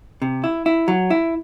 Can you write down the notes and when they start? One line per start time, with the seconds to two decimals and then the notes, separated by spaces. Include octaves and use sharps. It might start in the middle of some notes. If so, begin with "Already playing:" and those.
0.22 C3
0.44 E4
0.66 E4
0.88 F#3
1.10 E4